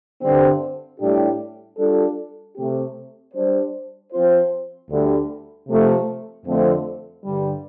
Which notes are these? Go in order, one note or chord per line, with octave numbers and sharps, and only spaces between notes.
G2 D3 G3 C4
A2 G3 D4 G4
G3 D4 F4 A4
C3 A3 C4 G4
G3 D4 G4 C5
F3 C4 F4 C5
D2 D3 G3
C3 F3 A3
F2 D3 F3 A3 C4
G2 D3 G3